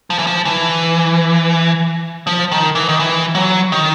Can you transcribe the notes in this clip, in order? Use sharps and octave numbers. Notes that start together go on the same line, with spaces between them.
F3
E3
F3
E3
F3
D#3
E3
D#3
E3
F#3
D#3